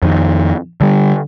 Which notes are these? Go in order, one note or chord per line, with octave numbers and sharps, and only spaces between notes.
F2 D#3
D3 G3